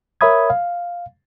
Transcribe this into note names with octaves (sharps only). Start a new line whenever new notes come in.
A#4 C#5 E5 B5 D#6 G#6
F5